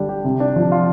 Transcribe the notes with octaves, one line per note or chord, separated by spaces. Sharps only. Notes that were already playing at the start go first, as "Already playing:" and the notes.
Already playing: D3 G3 D4
G4
C3
D4
F3
F4